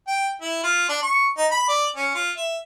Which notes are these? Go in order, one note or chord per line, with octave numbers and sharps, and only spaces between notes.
G5
E4
F4
D4
C#6
D#4
B5
D5
C#4
F4
E5